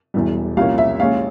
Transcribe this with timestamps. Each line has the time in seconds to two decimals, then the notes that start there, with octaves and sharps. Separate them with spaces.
0.14 E1 E2 E3 G3
0.57 C2 A#2 F3 A#3 C#4 F5
0.78 E5
0.99 A#1 A#2 G#3 C#4 F5